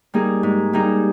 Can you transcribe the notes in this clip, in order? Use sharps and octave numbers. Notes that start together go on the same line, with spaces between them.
G3 A#3 D#4 G#4
G#2
G3 A#3 D#4 G#4